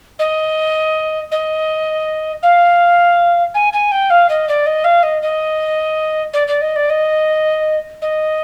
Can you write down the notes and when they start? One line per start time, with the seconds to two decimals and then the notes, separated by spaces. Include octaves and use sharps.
0.19 D#5
1.31 D#5
2.42 F5
3.54 G#5
3.72 G#5
3.91 G5
4.10 F5
4.29 D#5
4.48 D5
4.66 D#5
4.84 F5
5.03 D#5
5.22 D#5
6.33 D5
6.47 D5
6.61 D#5
6.75 D5
6.89 D#5
8.01 D#5